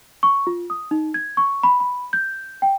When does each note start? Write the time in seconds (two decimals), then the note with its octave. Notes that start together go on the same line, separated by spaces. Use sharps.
0.23 C#6
0.47 F4
0.70 D#6
0.91 D#4
1.14 G#6
1.37 C#6
1.63 B5
1.80 B5
2.13 G6
2.62 G5